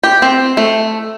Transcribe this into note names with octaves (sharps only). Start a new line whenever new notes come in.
G4
C4
A3